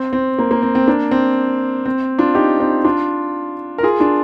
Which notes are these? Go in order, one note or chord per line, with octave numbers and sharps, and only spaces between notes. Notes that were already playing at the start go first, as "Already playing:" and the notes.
Already playing: C4
C4
A#3
A#3
C4
C4
A#3 D4
C4
C4
D4 F4
D#4 G4
C4 D#4
D4 F4
A#4
F4 G#4
D4 F4